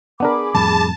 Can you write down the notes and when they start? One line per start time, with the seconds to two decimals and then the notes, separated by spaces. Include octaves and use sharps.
0.20 B3 D4 G#4 A#4 B5 D6
0.54 F2 A2 G3 A5